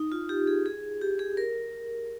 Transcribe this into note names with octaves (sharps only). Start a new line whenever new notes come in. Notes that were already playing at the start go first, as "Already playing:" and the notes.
Already playing: D#4
F4
G4
G#4
G#4
G4
G#4
A#4